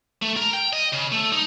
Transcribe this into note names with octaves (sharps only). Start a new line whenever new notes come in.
A3
A#4
G5
D#5
C#3
A3
D#4